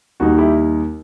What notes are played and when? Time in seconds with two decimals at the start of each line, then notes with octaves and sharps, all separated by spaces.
0.20 D#2 D#3 G3 D#4 F#4
0.38 E4 G4